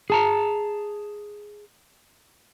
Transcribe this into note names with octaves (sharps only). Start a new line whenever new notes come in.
G#4 A5 A#5